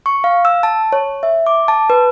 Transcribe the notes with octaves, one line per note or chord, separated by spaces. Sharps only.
C#6
F5
E6
A5
C#5
E5
D6
A5
B4